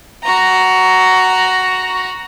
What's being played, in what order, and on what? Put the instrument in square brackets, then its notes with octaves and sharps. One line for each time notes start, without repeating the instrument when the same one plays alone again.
[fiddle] F#4 A#5